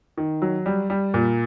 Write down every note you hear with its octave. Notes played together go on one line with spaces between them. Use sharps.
D#3
F#3
G3
G3
A#2